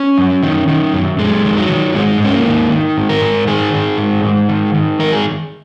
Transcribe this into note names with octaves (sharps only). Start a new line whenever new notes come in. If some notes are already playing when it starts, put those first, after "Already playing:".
Already playing: C#4
F#2
D#3
D#3
F#2
F#2 G#3
D#3
F#3
D#3
G#2 G#3
G#2 C#4
A#3
D#3
D#3
G#2
A#4
G#2
D#3 G#4
D#3
G#2
G#2
D#3
D#3
G#2 A#4
G#4